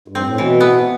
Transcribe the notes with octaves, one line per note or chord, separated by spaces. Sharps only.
G2
C4
A2
B2 E3
B3